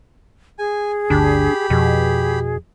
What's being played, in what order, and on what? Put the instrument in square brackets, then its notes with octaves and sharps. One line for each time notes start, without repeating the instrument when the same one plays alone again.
[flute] G#4 [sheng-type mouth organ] G#5
[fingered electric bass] G1 D2 [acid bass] D4 [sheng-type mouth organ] G4 B5
[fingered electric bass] F2 [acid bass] B2 [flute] G#4